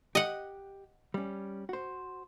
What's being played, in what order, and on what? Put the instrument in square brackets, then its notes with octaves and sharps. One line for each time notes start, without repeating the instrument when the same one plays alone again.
[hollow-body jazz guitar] G4 [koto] D#5 F#5
[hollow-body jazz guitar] G3 C#4
F#4 C5